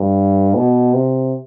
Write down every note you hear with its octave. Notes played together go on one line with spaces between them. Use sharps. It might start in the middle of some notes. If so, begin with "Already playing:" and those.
Already playing: G2
B2
C3